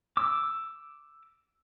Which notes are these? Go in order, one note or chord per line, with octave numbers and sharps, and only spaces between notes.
D6 E6